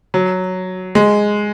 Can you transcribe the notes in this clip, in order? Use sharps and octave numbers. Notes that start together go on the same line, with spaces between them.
F#3
G#3